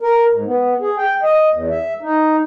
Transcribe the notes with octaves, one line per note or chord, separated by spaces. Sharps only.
A#4
G#2
B3
G#4
G5
D#5
E2
E5
D#4